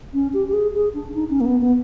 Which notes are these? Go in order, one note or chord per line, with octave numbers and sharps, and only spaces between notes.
C#4
G4
G4
G#4
G#4
D4
D#4
C#4
A#3
B3
B3